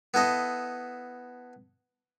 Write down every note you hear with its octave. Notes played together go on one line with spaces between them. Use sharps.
B3 E4 A4 D#5